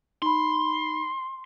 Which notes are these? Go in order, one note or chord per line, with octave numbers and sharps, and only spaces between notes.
D#4 B5 C6